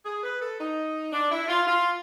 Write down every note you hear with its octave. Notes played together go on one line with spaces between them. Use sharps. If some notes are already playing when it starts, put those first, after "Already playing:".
G#4
B4
A4
D#4
D4
E4
F4
F4